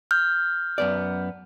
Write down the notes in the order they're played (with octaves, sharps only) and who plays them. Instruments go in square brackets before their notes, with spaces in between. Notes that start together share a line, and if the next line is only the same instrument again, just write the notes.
[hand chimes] F6 G6
[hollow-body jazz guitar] F#2 B3 D5